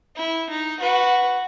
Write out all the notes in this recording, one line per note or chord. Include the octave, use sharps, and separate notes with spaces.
E4
D#4
F#4 B4